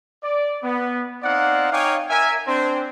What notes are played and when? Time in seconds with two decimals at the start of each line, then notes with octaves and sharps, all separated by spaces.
0.23 D5
0.63 B3
1.23 C4 D#4 D5 F5 F#5
1.72 D#4 C#5 F5 G5 G#5 D6
2.10 A#4 E5 G#5
2.47 C4 D4 C5